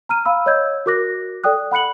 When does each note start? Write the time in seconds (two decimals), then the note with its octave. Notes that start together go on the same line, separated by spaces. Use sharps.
0.09 A#5 F6 D#7
0.25 F5 B5 E6
0.46 C#5 D#5 E6 G6 G#6
0.86 F#4 A#4 D6 F#6 A#6
1.44 A4 D5 G5 D#6 F#6
1.71 F#5 B5 F#6 C#7 F#7